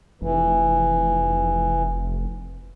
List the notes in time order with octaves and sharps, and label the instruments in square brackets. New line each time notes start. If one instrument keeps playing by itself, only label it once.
[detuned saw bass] F1 [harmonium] E3